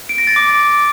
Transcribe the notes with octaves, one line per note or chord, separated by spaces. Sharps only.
D7
A#6
A6
D6